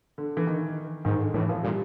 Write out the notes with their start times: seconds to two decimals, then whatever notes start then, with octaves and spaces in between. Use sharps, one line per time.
0.18 D3
0.37 E3
0.47 D#3
1.05 G#2 D#3
1.20 D3
1.34 A2 E3
1.49 F3
1.63 A#2 G3